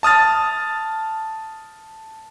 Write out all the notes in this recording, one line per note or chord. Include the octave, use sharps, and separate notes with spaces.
A5 D#6 F6 A6